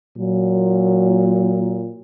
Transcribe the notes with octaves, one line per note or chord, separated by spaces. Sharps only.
A#2 F#3